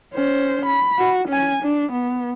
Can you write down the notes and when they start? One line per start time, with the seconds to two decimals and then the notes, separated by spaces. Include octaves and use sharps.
0.13 C#4 C5
0.66 B5
0.99 F#4
1.28 C#4 G#5
1.62 D4
1.92 B3